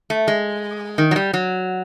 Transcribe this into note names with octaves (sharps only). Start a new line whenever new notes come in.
A3
G#3
D#3
F#3
G3
F#3